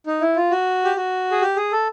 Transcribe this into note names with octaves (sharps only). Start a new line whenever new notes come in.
D#4
E4
F4
F#4
G4
F#4
G#4
G4
G#4
A4